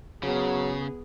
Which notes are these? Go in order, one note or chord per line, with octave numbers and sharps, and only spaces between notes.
C#3 F#3 B3 G#4